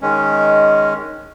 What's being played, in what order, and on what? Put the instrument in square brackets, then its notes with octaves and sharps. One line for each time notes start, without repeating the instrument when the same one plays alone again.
[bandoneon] D#3 G#3 C#4